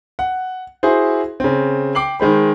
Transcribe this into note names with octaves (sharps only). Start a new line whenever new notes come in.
F#5
E4 F#4 G#4 C5
C#3 C4
G5 D6 C7 F#7
D#3 G#3 C5 B5